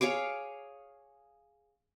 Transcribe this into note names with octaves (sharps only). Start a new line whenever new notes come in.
G#4 C#5 F5 D6